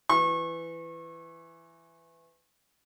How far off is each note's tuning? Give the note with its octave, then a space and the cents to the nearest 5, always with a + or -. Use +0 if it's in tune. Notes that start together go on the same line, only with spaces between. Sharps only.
E3 +15 C#6 -30